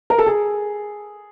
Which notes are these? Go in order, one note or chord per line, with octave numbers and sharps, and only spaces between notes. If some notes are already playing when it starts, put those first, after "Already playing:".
A#4
A4
G#4